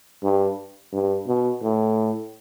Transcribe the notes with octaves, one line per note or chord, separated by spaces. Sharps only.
G2
G2
B2
A2